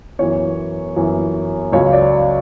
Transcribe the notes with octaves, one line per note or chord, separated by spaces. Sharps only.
F#2 E3 B3 C#5
F#2 E3 B3
C#2 C#3 F#3 C#5
D5